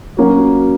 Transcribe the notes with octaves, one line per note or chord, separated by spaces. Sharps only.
F#3 A#3 C#4 F#4